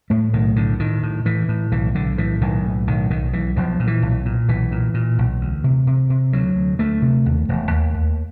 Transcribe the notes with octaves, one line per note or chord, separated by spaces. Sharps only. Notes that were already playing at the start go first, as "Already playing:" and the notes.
A2 A3
B1 D#3
A2 D3
A2 D#3
A2
A2 E3
A2
B1 E3
B1 D3
A2 E3
B1 D#3
A2
B1 D#3
B1 D#3
B1 E3
B1 F3
A#2
E3
B1
A#2
B1 E3
A#2
A#2
B1
D2
C3
C3
C3
D2 F#3
D2
D2 A3
C3
D#2
E1
D#2
D#2